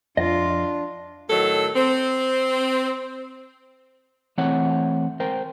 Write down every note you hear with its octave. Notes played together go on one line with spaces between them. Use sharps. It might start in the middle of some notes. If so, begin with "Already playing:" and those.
F2 D4 F4 D#5
A2 D#3 F#3 A4
C4
E3 A3 C4 C#5 F#5
A#4 C5 G5